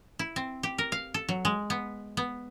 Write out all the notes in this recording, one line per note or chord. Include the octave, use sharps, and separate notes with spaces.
E4
C4
G4
A#4
F5
A4
F#3
G#3
B3
B3